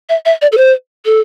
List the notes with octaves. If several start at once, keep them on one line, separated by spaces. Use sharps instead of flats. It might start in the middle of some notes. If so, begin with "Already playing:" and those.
E5
E5
D5
A4
C5
A4